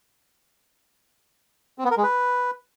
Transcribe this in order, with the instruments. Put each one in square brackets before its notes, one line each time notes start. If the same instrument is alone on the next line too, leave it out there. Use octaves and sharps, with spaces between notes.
[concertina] C4
B3
A#4
G#3
B4